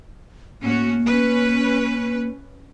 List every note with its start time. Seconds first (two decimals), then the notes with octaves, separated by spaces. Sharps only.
0.62 A2 A#3 C#4 F#4
1.05 C#4 B4